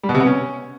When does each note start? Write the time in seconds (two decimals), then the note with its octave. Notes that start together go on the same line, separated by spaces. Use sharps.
0.03 G3
0.09 B2
0.14 C3
0.20 B3
0.26 C#4